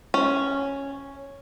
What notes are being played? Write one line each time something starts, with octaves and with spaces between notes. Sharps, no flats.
C#4